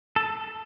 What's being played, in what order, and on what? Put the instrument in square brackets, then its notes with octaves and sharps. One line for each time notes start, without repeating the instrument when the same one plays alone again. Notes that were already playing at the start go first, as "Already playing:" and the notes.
[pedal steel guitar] A4